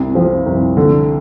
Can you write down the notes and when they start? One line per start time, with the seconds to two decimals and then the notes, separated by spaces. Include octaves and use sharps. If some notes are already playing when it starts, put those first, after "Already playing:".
Already playing: C2
0.15 F3
0.46 C2
0.77 D3